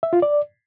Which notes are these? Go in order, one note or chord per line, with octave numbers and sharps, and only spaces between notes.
E5
F4
D5